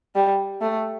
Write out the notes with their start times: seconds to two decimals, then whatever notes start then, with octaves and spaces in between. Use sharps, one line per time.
0.15 G3
0.61 A3